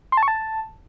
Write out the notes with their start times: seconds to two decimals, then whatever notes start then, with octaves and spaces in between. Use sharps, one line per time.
0.12 C6
0.17 A5
0.23 C#6
0.28 A5